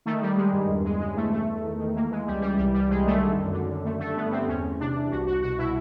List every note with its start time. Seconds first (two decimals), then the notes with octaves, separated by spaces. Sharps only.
0.06 D#3 A3
0.22 D#3 G3
0.37 D#3 G#3
0.53 G2
0.68 E2
0.85 E2 G#3
1.00 C#3 G#3
1.16 E3 A3
1.32 E2 A3
1.48 E2
1.63 D#3
1.79 D#3
1.95 E3 A#3
2.11 E3 G#3
2.27 C#2 G3
2.42 E3 G3
2.58 C2 G3
2.73 C2 G3
2.89 C2 G#3
3.05 D#3 A3
3.21 D3
3.37 F#2
3.53 D3
3.68 F#2
3.84 D3 A3
4.00 G2 A3
4.16 D3 B3
4.31 G2 C4
4.48 E2 C#4
4.63 E2
4.79 C3 D4
4.95 E3
5.11 C2 F#4
5.26 C2 F#4
5.42 B2 F#4
5.58 B2 E4